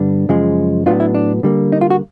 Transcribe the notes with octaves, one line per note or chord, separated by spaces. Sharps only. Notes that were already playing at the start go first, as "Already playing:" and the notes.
Already playing: G2 D3 G3 B3 D4
F#2 C#3 F3 G#3
A2 F#3 B3 D4 F4
E4
D4
D3 G3 A#3
D#4
F4
F#4